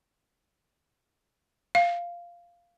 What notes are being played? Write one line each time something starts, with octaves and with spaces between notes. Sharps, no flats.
F5